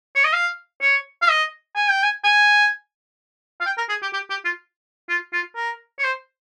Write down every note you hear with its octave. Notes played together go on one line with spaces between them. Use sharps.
C#5
D#5
F5
C#5
F5
D#5
G#5
G5
G#5
G#5
F5
G5
A#4
G#4
G4
G4
G4
F4
F4
F4
A#4
C#5
C5